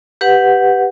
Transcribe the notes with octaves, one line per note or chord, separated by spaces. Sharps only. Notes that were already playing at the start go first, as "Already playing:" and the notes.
G4 B4 F#5